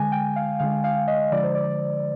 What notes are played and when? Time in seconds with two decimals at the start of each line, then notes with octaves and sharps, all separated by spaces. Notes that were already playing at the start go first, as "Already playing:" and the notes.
Already playing: D3 G#3 G#5
0.12 G5
0.36 F5
0.59 D3 G#3 F5
0.84 F5
1.08 D#5
1.32 D3 F3 G#3 D5
1.44 C5
1.55 D5